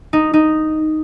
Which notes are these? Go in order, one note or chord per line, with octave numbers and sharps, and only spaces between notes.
D#4
D#4